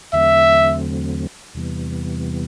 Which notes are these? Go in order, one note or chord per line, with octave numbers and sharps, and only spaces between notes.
E2 D3 F#3 A3 C4 E5
E2 C3 E3 G3 B3